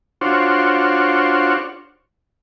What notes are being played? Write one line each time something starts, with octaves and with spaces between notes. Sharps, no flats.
D4 F4 F#4 C5 C#5